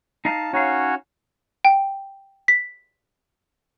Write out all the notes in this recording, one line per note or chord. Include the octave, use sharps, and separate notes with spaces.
D#4 D#5 F5 A5
C#4 D#4 F#4 C#5 F5
G5
B6